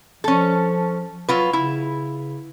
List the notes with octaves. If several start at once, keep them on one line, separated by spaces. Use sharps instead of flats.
F3 C#4 A4
F#3 F4 B4
C#3 E4